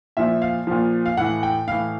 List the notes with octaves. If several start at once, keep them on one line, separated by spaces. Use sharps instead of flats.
A#2 F3 E5
F5
A#2 F3
F5
A2 E3 F#5
G5
A2 E3 F5